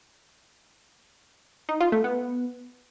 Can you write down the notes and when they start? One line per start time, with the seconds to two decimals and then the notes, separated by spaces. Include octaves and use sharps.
1.69 D#4
1.80 F4
1.92 A3
2.04 B3